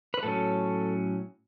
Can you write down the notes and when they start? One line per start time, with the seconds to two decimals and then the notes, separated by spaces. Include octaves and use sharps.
0.14 B4
0.23 A2 F#3 C#4 A4